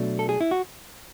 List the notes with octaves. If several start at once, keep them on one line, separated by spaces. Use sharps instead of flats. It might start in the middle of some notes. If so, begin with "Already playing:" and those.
Already playing: B2 F#3 A3 D4
A4
G#4
E4
F#4